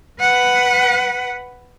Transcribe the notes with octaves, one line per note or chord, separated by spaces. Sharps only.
B4 F#5